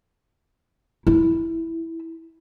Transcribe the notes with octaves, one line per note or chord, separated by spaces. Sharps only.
E4